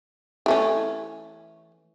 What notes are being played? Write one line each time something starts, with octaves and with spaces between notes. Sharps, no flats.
E3 A3 C#4